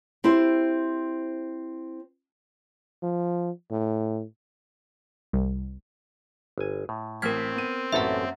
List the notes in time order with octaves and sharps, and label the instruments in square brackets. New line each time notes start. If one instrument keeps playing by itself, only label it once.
[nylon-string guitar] C4 E4 G4 C5
[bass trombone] F3
A2
[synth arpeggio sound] C2
[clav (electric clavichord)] G1 G#5
A2
[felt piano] A1 F6 B6 [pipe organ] C4 [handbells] A#4 G#6
[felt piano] B3 D#7
[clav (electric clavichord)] A1 A2 A4 [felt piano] F#2 A#3 C#4 [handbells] E5 F#5